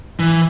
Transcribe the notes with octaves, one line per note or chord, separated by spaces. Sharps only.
E3